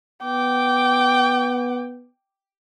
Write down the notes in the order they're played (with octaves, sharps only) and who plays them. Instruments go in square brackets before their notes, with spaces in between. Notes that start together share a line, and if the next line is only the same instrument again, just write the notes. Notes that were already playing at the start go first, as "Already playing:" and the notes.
[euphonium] B3 [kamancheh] G5 D6